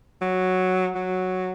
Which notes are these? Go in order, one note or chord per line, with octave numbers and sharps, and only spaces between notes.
F#3
F#3